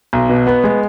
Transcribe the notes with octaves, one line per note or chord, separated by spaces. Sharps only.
B1
B2
B3
G#3